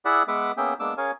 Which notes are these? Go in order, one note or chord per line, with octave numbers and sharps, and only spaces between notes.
E4 G#4 D5 E5 F#5
G#3 B3 B4 E5 F#5 D6
A#3 B3 C#4 G#4 E5 G5
G#3 A#3 B3 D4 D6 E6
C#4 G#4 A#4 C#5 F5 G#5